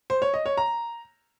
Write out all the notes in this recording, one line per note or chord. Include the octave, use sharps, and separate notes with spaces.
C5
C#5
D#5
C#5
A#5